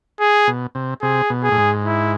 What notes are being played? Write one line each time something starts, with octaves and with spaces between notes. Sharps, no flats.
G#4
B2
C3
C3 G#4
B2
G#4
A2
G#2
E4